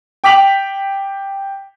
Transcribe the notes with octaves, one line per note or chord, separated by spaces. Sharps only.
G5 D6 B6 F7 F#7